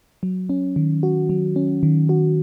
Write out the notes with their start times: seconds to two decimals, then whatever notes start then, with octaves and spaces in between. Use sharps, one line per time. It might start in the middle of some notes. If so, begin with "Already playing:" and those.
0.23 F#3
0.49 C#4
0.76 D#3
1.03 F#4
1.29 F#3
1.56 C#4
1.83 D#3
2.09 F#4